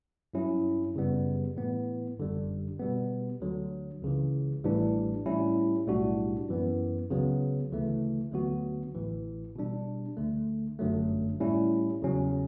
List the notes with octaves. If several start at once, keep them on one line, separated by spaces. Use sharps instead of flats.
G2 F#3 C#4 E4
F#2 C#3 G3 B3
A2 E3 B3
G1 F#2 D3 G3
B2 G3 B3
D2 D3 F#3
C#2 C#3 E3
A1 A2 E3 G3 D4
A2 G3 C#4 E4
B1 A2 G3 D4 F#4
F#2 E3 B3
C#2 C#3 F#3 B3
D2 C#3 E3 A3
D2 D3 F#3 B3 F#4
A1 A2 E3
B2 G3 D4
D2 D3 A3
G1 F#2 D3 F#3 A3
A2 G3 C#4 E4
E2 C#3 F#3 C#4